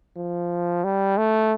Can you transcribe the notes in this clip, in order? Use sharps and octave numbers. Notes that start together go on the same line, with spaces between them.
F3
G3
A3